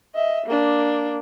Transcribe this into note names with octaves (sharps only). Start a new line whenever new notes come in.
D#5 E5
A#3 D4